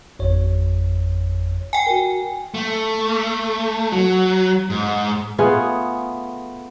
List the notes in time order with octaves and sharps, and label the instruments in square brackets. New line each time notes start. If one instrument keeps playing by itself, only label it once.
[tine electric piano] G#1 F2 C#5
[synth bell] G5 G#5
[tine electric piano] F#4 A#4
[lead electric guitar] A3
F#3
G#2
[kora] A3 B3 F4 G#4